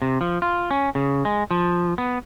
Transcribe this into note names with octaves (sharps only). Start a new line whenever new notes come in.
C3
F3
F4
C#4
C#3
G#3
F3
B3